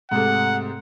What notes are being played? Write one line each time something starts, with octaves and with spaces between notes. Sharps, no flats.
G#2 C3 A3 F#5